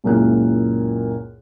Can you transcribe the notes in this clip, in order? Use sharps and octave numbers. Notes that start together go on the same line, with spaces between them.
C#2 F#2 A#2 A#3 E4 F#6